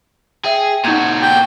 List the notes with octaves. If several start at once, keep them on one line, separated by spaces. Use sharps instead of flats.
G#4 E5 G5
A#2 D#4 F#4 G6 G#6
G5